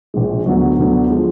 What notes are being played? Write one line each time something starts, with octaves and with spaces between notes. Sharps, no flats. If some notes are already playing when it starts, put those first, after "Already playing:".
A#1 A#2 G#3
D2 D3 F#3 B3
D2 D3 F#3 B3
F3 G#3